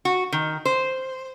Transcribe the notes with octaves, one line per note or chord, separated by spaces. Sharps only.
F#4
D#3
C5